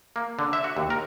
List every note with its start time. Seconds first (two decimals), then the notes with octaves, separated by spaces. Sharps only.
0.16 A#3
0.39 D3
0.53 E5
0.64 F#4
0.77 D#2
0.90 A#4